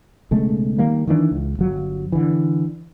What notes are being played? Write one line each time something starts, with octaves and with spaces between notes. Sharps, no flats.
B1 C#3 G#3 A3
D#3 G3 A#3
D#3 E3 G3 D4
C#2
G1 F#3
D3 E3